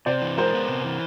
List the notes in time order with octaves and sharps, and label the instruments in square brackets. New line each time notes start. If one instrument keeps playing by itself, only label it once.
[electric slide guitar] C3 [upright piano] C5 D5
[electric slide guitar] E3
[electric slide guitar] G#3 [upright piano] A#4 C5
[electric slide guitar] B3
C3
E3